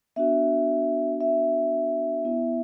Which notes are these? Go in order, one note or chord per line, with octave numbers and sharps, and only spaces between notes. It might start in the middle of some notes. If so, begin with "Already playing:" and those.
B3 D4 F#4 E5
E5
B3 E4